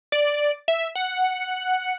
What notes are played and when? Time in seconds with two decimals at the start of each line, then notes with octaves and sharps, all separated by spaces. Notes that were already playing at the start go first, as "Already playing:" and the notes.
0.12 D5
0.68 E5
0.95 F#5